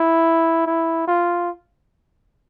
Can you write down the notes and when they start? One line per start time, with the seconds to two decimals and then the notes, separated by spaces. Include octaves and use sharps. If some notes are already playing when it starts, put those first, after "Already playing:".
Already playing: E4
0.66 E4
1.07 F4